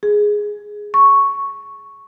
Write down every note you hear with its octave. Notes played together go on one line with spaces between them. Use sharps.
G#4
C#6